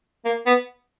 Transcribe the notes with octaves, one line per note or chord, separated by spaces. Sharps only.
A#3
B3